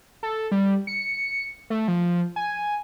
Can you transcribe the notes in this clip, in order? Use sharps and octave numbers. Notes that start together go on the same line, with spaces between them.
A4
G3
C#7
A3
F3
G#5